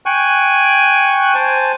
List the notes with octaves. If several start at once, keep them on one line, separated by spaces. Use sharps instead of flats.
G5 G#5 C#6 F#6
C5 G#5 A5